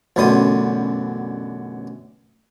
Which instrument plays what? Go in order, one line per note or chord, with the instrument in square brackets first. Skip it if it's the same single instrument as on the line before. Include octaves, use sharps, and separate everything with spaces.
[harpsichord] A1 F#2 B2 D3 C6 D#6